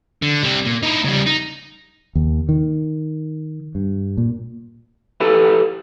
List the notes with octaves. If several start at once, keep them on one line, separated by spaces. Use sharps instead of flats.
D3
G3 C4
A#2
D#4 E4
C#3 G3
D#4
D#2
D#3
G2
A#2
E4 G4 A4 B4